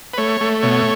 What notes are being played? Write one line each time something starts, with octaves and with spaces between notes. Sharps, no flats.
B4
A3 C#5
A3
B2 C#5